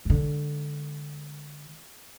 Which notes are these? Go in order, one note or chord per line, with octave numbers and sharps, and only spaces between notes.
D3 G#3